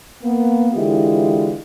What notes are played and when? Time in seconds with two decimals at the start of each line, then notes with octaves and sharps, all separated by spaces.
0.23 A#3 B3
0.74 D3 E3 G#3 E4 F4 G4